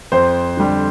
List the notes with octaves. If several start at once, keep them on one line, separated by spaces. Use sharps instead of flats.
F2 C5
D3 G3